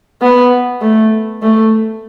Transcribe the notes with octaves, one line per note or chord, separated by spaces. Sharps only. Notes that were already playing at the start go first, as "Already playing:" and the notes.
B3
A3
A3